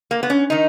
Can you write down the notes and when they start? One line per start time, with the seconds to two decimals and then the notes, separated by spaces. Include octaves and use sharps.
0.11 A#3
0.23 B3
0.30 C#4
0.50 D#3 D#4